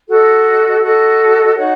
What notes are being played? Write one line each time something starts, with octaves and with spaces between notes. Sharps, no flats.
F#4 A4 D#5
F#4 A4 D#5
D#4 F#4 C#5 F#5